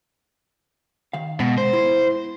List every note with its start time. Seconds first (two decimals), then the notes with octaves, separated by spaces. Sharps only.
1.13 D#3 F5
1.40 B2 G#3
1.58 C5
1.73 E4